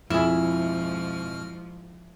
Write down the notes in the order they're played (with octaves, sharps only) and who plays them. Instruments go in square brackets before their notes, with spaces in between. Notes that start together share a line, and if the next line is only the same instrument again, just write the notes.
[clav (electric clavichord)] F2 G#4 [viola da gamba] G#2 F3 [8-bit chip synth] B2 F6 [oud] E4